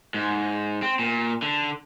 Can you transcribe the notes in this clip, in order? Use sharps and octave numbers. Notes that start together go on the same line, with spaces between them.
G#2
C4
A#2
D3